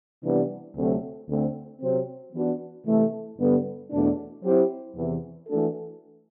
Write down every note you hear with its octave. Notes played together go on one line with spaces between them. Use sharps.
C3 E3 G3 B3 D4
D2 C3 F#3 A3 C4
D2 D3 A3 C4
C3 F#3 C4
E3 B3 D4 F#4
C3 E3 A3
G2 D3 G3 B3
E2 B2 F#3 A3 D4
F#3 C4 E4 G4 C5
E2 C3 E3
E3 A3 D4 F#4 A4